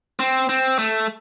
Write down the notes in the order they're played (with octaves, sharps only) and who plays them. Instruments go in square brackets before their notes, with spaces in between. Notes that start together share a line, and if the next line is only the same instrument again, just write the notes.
[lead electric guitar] C4
C4
A3